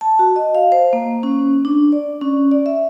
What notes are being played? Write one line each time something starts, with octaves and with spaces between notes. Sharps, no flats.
A5
F#4
D#5
F5
C5
A#3
C#4
D4
D5
C#4
D5
E5